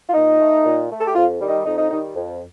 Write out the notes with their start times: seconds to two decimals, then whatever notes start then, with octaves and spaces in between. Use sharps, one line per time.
0.09 F4
0.14 A#2 D#4
0.40 A3
0.65 A#2
0.90 A3
1.00 A4
1.07 G4
1.15 F2 F4
1.41 D#3 G3
1.48 D#4
1.65 F2 D#4
1.78 D#4
1.90 D#3 G3 D#4
2.15 F2